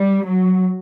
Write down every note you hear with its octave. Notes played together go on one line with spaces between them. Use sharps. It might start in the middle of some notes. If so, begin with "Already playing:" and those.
Already playing: G3
F#3